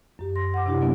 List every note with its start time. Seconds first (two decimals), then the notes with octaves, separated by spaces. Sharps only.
0.19 F#2 G4
0.36 C6 A#6
0.54 F#5 D6
0.66 C3 D4 E4 G4
0.81 F#3 B3 C4 D4